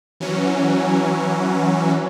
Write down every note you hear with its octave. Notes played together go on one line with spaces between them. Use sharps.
E3 F#3 C#4